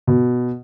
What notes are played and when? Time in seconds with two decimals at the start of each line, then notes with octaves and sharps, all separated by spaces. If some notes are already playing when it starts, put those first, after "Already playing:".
0.07 B2